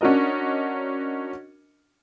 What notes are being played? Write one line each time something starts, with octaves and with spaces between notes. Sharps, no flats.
C#4 D4 F#4 A#4 D#5